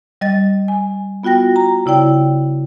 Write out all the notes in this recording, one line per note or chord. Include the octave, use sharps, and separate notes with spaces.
G3 D#5 A6
G#5
B3 F4 F#4 G5 A#6
A#5
C#3 E4 D5 G5